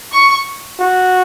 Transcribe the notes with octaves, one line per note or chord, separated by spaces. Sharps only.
C#6
F#4